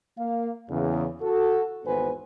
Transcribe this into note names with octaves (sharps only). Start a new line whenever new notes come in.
A#3 F5
E2 C#3
F#4 A4
G#1 E2 B3 B4 C5 G#5